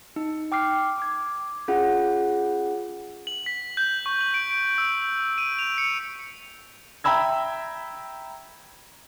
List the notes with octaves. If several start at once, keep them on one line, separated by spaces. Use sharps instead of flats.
D#4
G5 D6 F6 C7
D6 G#6
C#4 F4 G#4 F#5
F#7
B6
G6
C#6
F#7
D7
D7
E6
D#7
F7
C#7
E5 G5 A#5 B5 E6 G#6